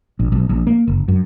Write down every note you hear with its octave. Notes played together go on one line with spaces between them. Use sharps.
A#1
B1
A#1
A#3
F#1
F#2